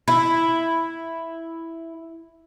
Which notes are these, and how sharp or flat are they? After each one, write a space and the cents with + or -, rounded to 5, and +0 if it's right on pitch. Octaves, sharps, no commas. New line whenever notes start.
E4 +0